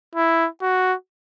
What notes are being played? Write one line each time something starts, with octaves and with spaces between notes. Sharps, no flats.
E4
F#4